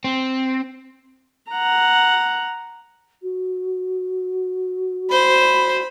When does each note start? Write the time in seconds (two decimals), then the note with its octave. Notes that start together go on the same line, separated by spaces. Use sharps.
0.04 C4
1.52 F#5 A#5
3.22 F#4
5.11 C5 B5